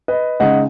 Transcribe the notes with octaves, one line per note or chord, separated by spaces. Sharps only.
B4 D#5
C#3 G#3 D#4 D#5 F#5